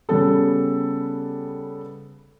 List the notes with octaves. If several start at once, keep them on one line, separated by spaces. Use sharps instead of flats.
C#3 G3 B3 A4